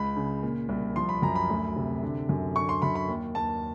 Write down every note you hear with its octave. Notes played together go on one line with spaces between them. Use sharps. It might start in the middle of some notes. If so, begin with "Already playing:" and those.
Already playing: C#2 B5
C#3
A#2
C2
F3 C6
B5
F#2 A#5
B5
D2
C3
D3
F#2
D3 C#6
C6
F#2 B5
B5
D#2
D#2 A5